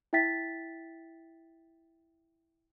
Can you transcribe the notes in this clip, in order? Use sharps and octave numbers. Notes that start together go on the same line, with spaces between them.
E4 E5 G5 A6 B6